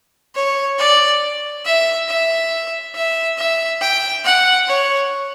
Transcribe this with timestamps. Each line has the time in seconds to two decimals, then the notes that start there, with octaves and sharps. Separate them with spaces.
0.35 C#5
0.79 D5
1.65 E5
2.09 E5
2.95 E5
3.38 E5
3.81 G5
4.25 F#5
4.67 C#5